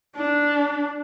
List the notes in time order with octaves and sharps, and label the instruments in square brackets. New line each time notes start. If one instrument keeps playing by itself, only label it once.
[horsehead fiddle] D4